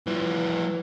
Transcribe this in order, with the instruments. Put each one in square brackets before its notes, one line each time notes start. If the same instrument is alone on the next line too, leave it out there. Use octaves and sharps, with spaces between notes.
[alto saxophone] E3 [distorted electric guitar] F3 G3